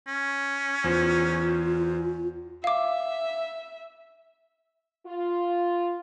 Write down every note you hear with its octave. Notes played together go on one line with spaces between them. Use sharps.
C#4
E2 F4 C5
E5 F5 D6
F4